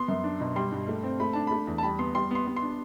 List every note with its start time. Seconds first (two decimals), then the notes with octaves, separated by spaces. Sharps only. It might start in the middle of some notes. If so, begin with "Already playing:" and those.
Already playing: B3 C6
0.08 F#2
0.24 D4
0.40 B2
0.56 G3 C6
0.72 G2
0.88 A3
1.03 C4
1.20 A3 B5
1.33 D4 A5
1.47 A3 B5
1.67 E2
1.78 A5
1.83 G3 B5
1.99 B3 C6
2.15 G3 C6
2.31 B3 C6
2.47 B3
2.56 C6
2.62 D4